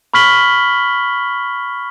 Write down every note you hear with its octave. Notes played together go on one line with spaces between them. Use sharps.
B5 C#6 F6 B6 F#7 G7